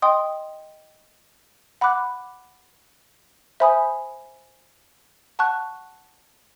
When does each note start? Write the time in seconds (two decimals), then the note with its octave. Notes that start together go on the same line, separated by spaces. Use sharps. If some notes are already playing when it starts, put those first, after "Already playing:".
0.02 D#5 G5 C6 D#6
1.81 F#5 B5 D6 F#6
3.60 C5 E5 G#5 B5 D#6
5.39 F#5 A5 C#6 F#6